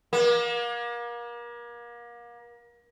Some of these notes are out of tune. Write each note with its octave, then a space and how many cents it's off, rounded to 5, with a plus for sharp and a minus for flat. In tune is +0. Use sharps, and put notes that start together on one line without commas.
A#3 +35